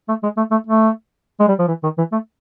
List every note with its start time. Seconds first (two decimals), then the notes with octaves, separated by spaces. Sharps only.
0.08 A3
0.23 G#3
0.37 A3
0.51 A3
0.67 A3
1.40 G#3
1.48 G3
1.59 F3
1.68 E3
1.83 D#3
1.98 E3
2.12 A3